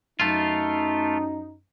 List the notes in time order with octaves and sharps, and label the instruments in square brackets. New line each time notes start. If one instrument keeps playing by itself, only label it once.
[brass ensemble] F#2 D#4 [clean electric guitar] A3 F4